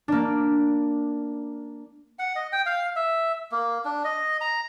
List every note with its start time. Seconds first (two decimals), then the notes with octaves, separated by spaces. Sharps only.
0.08 A#3 D4
2.19 F#5
2.36 D#5
2.53 G5
2.66 F5
2.96 E5
3.52 A#3
3.85 D4
4.04 D#5
4.41 A#5